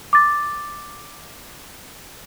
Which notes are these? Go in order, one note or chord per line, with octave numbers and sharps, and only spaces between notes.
D6 A6